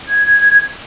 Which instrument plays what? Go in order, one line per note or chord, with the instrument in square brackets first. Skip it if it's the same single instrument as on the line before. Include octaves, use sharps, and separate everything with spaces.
[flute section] G#6